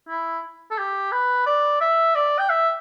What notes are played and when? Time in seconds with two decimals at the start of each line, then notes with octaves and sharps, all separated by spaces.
0.09 E4
0.71 A4
0.78 G4
1.12 B4
1.46 D5
1.81 E5
2.15 D5
2.39 G5
2.49 E5